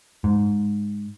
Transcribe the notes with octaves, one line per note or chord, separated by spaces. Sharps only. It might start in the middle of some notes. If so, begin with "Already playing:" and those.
G#2